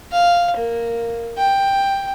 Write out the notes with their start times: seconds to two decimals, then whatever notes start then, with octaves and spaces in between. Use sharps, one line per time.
0.12 F5
0.57 A#3
1.38 G5